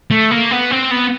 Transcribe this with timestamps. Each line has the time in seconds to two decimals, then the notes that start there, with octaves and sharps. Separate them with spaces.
0.11 A3
0.31 A#3
0.51 B3
0.71 C4
0.91 B3